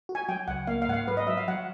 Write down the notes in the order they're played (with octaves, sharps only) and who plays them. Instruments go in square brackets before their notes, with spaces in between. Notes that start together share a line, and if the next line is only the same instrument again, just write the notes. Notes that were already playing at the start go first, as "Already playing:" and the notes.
[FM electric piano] F#4
[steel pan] G#5
[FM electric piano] F#3 [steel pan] G5
[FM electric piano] C#2 [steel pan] F#5
[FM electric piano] A#3 [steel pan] F5
[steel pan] F5
[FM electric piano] G#2 [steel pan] F#5
[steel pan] F5
[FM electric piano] F#3 [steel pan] B4
[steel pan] D#5
[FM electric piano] F#3 [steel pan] E5
[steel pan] F5
[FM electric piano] F#3 [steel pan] F#5